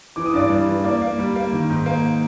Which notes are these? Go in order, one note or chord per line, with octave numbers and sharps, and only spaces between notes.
E3 D6
D#6
G2 D5 D6
G3
E3
A#3 D5 D6
A#3
G3
A#3
D#3
G#2
A#3